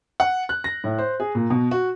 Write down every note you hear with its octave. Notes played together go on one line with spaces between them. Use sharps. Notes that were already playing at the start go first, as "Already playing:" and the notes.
F#5
F#6
A#6
A2
C5
G#4
A#2
B2
F#4